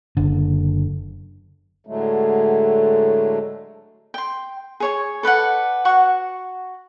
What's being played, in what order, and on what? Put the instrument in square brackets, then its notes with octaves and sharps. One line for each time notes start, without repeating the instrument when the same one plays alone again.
[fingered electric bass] F#1 D3
[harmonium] A2 D3 F#3 G#3 A3
[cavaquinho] G5 C6
G#4 C#5 C#6
A4 B4 D5 F#5
F#4 F#5 C#6